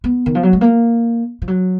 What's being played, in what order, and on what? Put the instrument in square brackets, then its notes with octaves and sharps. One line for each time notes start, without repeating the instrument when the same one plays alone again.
[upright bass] B3
D#3
F3
F#3
G#3
A#3
F3
F#3